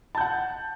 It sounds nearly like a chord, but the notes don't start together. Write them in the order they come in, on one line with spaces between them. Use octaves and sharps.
A5 G6 F#5